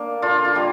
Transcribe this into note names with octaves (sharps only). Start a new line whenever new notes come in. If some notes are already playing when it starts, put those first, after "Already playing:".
Already playing: A#3 D4
D3 F4
F4
G3 A#3